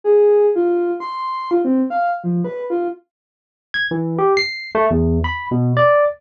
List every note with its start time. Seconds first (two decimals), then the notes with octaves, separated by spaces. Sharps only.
0.04 G#4
0.56 F4
1.00 C6
1.51 F4
1.65 C4
1.90 F5
2.24 F3
2.44 B4
2.70 F4
3.74 G#6
3.91 E3
4.19 G4
4.37 C7
4.75 A3
4.91 E2
5.24 B5
5.51 B2
5.77 D5